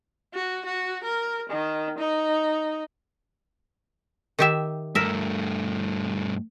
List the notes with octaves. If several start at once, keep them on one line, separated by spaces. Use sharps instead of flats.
F#4
F#4
A#4
D#3
D#4
D#3 G4 E5
G2 A3 A#4 E5